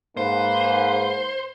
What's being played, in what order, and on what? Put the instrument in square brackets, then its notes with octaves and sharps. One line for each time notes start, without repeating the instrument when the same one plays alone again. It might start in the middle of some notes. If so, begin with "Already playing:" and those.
[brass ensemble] G#2 B4 [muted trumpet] A#3 [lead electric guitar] C5